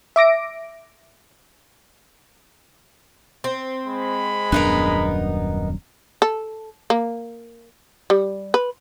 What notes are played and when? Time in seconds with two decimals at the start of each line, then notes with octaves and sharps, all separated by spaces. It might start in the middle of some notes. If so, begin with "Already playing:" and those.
0.16 E5 D6 A#6 D7
3.44 C4
3.85 G#3 B5
4.52 D#1 F#2 B3 D4 D#4 A#4
6.22 A4
6.90 A#3
8.10 G3
8.54 B4